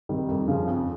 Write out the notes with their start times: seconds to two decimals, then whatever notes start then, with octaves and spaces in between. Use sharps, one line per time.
0.09 C3 D#3 G3
0.29 F2
0.48 C#3 F3
0.68 F2